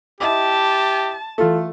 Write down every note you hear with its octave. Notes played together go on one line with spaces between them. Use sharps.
E4 G4 D#5 A5 D6
E3 A3 F4 A4